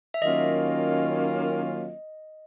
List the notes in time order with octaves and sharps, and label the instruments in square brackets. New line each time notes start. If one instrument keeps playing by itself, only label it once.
[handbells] E5
[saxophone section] D#3 F#3 A#3 C#4 F4 [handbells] D#5